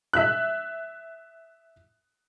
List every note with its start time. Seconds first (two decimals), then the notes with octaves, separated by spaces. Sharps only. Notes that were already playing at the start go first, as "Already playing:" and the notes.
0.13 E5 F#6